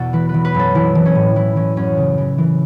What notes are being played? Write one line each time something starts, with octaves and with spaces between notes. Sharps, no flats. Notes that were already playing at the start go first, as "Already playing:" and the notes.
Already playing: E2 B2 F#4 A4
E3 B4
B4
E3
B4
F#2
A4
E3 E4
E3
C#4
A2
E3 E4
E3 C#4
F#2 C#4
C#3
E3
E3